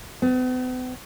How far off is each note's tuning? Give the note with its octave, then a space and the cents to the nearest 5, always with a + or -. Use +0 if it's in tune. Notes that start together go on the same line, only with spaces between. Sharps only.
B3 +45